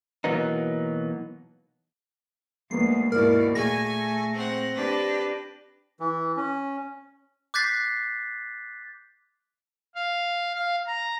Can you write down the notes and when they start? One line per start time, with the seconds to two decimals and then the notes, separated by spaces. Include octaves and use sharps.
0.24 B2 E3 F#3 A#3 B3 D#4
2.71 D2 G#3 A#3 B3 C7
3.12 D#2 G#2 B2 E4 A#4 D5
3.55 A#2 A3 G#4 G#5 A#6
4.34 C4 F#5
4.75 D4 G4 B4
6.00 E3
6.37 C#4
7.54 D6 F#6 G6 A6 B6 C7
9.95 F5
10.54 F5
10.87 A#5